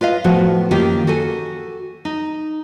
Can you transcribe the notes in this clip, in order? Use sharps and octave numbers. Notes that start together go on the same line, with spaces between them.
F4 B4 D#5 F5
A2 F3 B3 F#4
F#2 D#3 A#3 D#4 F4 G4
F#4 A4 G#5
D#4